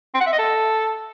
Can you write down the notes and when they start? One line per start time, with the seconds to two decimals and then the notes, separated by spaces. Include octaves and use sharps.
0.14 C4
0.20 F#5
0.26 E5
0.33 D#5
0.39 A4